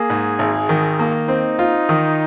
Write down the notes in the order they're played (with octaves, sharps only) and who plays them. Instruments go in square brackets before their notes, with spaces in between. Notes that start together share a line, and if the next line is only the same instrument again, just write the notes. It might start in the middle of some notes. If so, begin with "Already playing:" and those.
Already playing: [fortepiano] A#3 [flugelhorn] G#4
[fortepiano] G#2
G#1
D#3
A#3
[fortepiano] C4 [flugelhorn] D#4
[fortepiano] F4
D#3